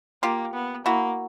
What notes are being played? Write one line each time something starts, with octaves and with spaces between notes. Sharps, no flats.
A#3 F4 G4
B3
A#3 E4 F#4